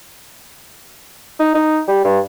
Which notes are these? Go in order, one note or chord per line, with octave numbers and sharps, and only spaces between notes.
D#4
D#4
G3
G2